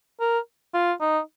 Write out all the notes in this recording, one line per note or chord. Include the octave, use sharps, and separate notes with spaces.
A#4
F4
D#4